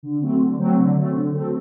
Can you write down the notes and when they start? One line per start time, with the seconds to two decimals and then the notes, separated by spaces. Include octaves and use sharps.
0.03 D3
0.22 F#3 A3 C4
0.40 D3
0.58 F#3 A3 C4
0.78 D3
0.96 F#3 A3 C4
1.15 D3
1.34 F#3 A3 C4